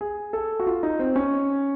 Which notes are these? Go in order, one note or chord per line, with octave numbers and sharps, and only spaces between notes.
G#4
A4
F#4
F4
D#4
C4
C#4